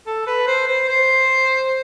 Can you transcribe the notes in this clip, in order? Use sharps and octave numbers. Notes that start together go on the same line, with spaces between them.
A4
B4
C5
C5
C5